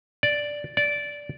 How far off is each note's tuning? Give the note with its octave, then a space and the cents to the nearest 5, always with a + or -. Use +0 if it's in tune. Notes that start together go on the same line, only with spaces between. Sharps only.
D5 -5
D5 -15